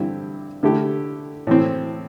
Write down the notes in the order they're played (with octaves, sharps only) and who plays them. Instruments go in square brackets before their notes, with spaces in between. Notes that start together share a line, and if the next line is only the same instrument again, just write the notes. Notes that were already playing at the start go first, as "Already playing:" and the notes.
Already playing: [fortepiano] G2 D3 C4 E4 G4
D3 A3 E4 G4
A2 E3 C4